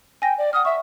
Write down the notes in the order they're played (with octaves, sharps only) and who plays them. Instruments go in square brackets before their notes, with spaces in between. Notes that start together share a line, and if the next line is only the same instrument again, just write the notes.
[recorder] G5 [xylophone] G#5 A#6
[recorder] D5
[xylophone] F#5 F6 [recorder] D#6
[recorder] E5 [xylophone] C#6